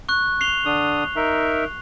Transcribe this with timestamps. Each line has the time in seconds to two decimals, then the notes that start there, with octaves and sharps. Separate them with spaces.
0.09 C#6 F#6
0.41 C7 F7 G7
0.66 D3 D4 D#6
1.16 D#4 A#4 E5